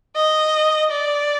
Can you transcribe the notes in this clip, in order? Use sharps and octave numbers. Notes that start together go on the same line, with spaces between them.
D#5
D5